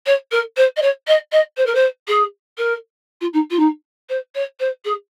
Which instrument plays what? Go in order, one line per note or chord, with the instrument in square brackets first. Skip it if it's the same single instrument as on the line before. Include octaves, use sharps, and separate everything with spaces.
[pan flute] C#5
A#4
C5
D#5
C#5
D#5
D#5
C5
A#4
C5
G#4
A#4
F4
D#4
F4
D#4
C5
C#5
C5
G#4